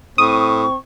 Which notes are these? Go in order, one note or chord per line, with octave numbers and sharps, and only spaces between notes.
A2 C4 C#6 D#6